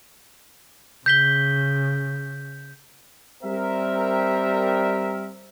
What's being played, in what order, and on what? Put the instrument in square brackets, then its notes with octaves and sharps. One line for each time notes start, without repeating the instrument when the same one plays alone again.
[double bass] C#3 [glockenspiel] G6 B6 G7
[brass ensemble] G3 C4 A#4 E5